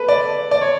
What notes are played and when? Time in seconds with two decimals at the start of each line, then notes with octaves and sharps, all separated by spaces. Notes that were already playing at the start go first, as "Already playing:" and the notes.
Already playing: A4 B4
0.08 D5
0.51 D5
0.61 C#5